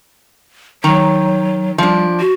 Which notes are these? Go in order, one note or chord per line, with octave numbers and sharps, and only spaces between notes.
D#3 F#3 A#5
F3 G3 D4
F#4